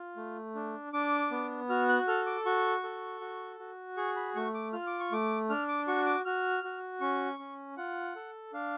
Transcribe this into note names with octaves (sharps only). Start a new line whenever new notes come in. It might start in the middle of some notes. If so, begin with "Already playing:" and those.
Already playing: F4
A3
D4
D4 D6
B3
F#4 F6
F#6
A4 F6
D6
F#4 C#6
A4
F#4
F#4
G#4 C#6
B5
A3 C#6
D6
F4 F6
D6
C#6
A3 D6
D4 F6
D6
F#4 C#6
D6
F#4 F6
F#4
C#4 C#6
C#4
F4 F#5
A4
D4 F5